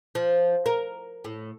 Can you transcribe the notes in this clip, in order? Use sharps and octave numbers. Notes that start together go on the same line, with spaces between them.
F3
A#4
A2